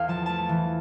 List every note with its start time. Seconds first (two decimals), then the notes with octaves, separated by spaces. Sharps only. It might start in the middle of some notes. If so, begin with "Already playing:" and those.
Already playing: E2 A4 F5 G5
0.08 F3 A5
0.26 A3 A5
0.49 E3